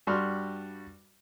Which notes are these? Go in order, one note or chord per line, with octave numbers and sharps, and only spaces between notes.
G2 G3 F#4 C6 F6